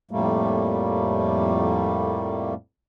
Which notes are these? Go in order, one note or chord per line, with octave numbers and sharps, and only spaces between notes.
F2 A2 G3 A3 A#3